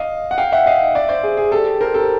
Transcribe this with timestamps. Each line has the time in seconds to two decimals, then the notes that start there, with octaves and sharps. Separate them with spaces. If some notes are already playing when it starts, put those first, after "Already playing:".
Already playing: D#5 F5
0.31 F#5
0.38 F5 G5
0.52 E5 F#5
0.66 D#5 F5
0.95 D5 E5
1.09 C5 D5
1.23 G#4
1.37 G#4
1.52 G4 A4
1.81 A#4 C5
1.94 G4 A4